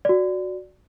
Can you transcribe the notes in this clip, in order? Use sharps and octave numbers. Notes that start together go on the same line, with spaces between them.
F#4 D5